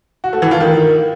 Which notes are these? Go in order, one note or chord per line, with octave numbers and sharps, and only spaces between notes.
F#4
A3
E3
F4
D#3